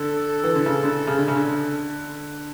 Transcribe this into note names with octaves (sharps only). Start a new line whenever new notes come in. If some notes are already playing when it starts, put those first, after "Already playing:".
Already playing: D3 A4
E3
D3
C#3
D3
C#3
D3
C#3
D3